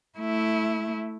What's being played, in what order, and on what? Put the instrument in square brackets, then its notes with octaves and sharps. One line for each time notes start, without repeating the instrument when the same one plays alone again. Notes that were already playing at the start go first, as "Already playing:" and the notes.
[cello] A3 E4